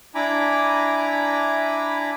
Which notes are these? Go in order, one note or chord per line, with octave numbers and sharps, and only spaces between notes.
D4 E4 G#5 A#5 B5 D6